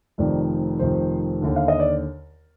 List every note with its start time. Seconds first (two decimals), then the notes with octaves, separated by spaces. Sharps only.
0.18 F1 F2 D#3 D5
0.79 F1 F2 D#3 C5
1.42 D#2 D3
1.56 F5
1.68 D#5
1.80 D5